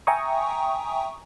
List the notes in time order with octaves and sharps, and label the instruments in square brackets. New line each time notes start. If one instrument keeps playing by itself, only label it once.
[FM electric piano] E5 G5 G#5 A#5 C#6 D#6